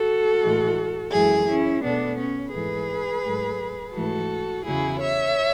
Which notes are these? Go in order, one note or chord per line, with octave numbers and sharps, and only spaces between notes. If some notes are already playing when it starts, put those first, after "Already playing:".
Already playing: F#4 A4
A2 E3 G#3
F#2 E3 G#3 E4 G#4
C#4 E4
B2 A3 B3 D4
C#4
G#2 E3 A3 G#4 B4
G#2 F#3 A3
G#2 E3 A3 F#4 A4
E2 C#3 F#3 E4 G#4
C#5 E5